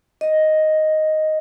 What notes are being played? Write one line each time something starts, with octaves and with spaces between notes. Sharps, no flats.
D#5